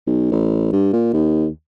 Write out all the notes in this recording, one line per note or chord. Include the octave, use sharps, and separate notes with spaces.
B1
A1
G2
A#2
D#2